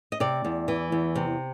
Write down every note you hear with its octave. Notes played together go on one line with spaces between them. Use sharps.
D#5
C3 D5
E2
E3
E2
C3